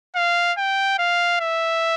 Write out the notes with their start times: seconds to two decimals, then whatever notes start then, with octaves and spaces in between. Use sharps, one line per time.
0.15 F5
0.58 G5
0.99 F5
1.40 E5